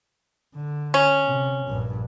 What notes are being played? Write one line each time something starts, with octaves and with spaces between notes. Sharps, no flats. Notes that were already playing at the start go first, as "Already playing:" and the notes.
D3
C#4
C3
A#1 G2